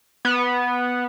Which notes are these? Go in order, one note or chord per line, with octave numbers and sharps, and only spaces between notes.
B3